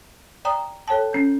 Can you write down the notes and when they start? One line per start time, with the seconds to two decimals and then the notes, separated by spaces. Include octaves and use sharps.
0.45 D5 G5 A#5 D#6
0.88 A4 C#5 G5 A5
1.13 C#4 G6